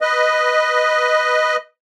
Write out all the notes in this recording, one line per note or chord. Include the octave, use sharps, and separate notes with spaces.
B4 D#5